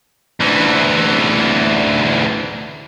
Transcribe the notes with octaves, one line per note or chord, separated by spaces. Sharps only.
D2 E3